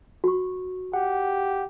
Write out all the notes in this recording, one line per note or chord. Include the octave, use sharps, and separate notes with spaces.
F#4 C#6
G4 F#5